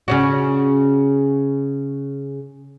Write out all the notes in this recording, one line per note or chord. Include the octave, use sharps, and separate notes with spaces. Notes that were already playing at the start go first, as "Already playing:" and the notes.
C#3 C#4 F#4